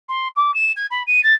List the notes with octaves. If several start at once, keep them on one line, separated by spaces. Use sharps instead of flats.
C6
D6
E7
G#6
B5
D#7
A6